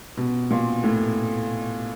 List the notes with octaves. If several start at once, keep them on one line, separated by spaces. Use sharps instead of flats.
B2
A#2
A2